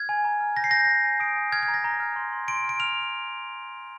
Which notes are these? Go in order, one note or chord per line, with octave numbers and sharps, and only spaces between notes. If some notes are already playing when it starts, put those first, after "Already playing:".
Already playing: F6 G#6
G#5
A#5
F6
G6 A#6
C7
G6 A#6
G#5
G#5
D#6 D7
G#5
F6 G#6
G#6
A#5
A#6
A#5
F6
C6
C6
C6 D7
F6
D7
F6 F7